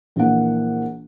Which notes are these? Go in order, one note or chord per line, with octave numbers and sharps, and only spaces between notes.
A#1 E3 A#3 F#5